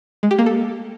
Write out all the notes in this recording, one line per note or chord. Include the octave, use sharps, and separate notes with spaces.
G#3
G4
A#3
A4